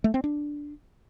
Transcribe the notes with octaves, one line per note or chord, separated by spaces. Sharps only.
A3
C4
D4